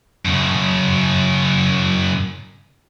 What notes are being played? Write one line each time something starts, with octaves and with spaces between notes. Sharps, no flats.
F#2 C#3